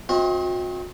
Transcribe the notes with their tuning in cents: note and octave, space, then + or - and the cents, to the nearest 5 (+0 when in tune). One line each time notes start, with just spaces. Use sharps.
C4 +20 F#4 -40 D#5 +40